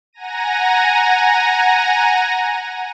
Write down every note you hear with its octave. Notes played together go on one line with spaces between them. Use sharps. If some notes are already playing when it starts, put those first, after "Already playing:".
F#5 G#5 A#5 A#6 D#7